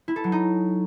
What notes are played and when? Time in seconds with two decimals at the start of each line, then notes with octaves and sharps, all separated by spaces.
0.08 E4
0.16 A4
0.24 F#3
0.32 D#4